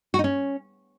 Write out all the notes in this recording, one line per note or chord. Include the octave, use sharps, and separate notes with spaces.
F#4
D#4
C#4